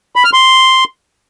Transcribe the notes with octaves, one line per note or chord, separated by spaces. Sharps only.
B5
F6
C6